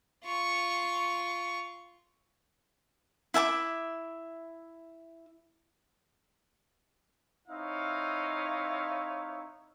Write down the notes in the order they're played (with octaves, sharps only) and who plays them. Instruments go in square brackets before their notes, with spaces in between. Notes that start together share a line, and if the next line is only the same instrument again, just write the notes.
[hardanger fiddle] F4 C#6
[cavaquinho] E4 E5 G#5 D6
[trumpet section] C4 D#4 E4 C#5 F5